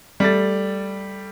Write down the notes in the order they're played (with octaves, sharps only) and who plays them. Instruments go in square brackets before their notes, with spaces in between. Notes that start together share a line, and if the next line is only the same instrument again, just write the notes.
[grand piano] G3 A3 A6